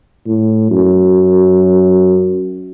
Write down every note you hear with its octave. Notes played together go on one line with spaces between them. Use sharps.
A2
F#2